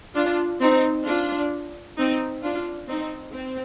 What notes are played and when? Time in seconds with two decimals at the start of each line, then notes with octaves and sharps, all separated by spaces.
0.15 D4 F4
0.61 C4 D#4
1.06 D4 F4
1.97 C4 D#4
2.43 D4 F4
2.88 C4 D#4
3.34 C4